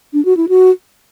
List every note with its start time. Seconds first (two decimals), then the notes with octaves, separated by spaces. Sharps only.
0.13 D4
0.25 F#4
0.37 E4
0.49 F#4